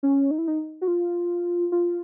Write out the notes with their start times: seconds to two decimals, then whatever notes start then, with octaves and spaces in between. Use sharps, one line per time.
0.03 C#4
0.31 D#4
0.38 E4
0.47 D#4
0.81 F#4
0.88 F4
1.72 F4